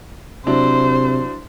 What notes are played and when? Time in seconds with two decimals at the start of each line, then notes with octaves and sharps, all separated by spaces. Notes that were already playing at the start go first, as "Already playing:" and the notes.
0.46 C3 F#3 D4 E4 C5